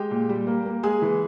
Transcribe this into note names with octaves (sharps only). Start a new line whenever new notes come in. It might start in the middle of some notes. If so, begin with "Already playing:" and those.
Already playing: G#3 G4 G5
A#2
G3
A#3
A#3
G#3 G#4 G#5
E3